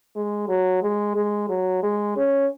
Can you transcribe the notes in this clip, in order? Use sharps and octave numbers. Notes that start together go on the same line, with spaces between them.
G#3
F#3
G#3
G#3
F#3
G#3
C#4